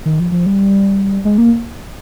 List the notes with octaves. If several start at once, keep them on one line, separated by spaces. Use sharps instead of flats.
D#3
F3
F3
G3
G#3
A#3